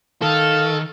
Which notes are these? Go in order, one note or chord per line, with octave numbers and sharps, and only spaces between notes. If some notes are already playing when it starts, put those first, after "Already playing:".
D#3 A4 F5